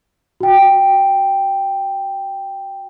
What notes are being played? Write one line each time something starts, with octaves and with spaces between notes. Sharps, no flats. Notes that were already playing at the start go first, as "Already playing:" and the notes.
F#4 G5